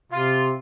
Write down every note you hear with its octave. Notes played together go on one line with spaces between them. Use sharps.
C3 F4